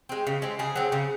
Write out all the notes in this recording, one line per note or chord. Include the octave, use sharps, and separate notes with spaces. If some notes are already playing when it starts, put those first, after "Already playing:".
G#3 C4
C#3
G#3 C4
C#3 G#4
F#3 C4
C#3